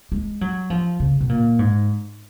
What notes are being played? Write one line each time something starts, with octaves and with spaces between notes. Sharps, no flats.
G#3
F#3
F3
C#3
B2
A#2
G#2